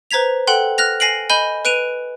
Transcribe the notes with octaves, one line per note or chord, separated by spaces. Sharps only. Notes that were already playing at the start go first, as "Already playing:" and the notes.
B4 C5 A#5 G#6 B6 F7
A4 F#5 G5 C6 F#6
F6 F#6 A#6 F7
G#5 A#6 C7 D7 F#7
D#5 G#5 B5 G6 G7
B4 F#6 D7 D#7 F7